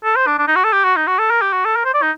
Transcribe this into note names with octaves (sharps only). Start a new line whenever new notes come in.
A4
C5
D4
D4
D#4
F#4
A4
G4
F#4
D#4
F#4
A4
A#4
G4
F#4
A4
A#4
C5
D5
D#4